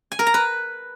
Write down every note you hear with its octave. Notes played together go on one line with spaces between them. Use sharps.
G#5
A#4
A#5
B4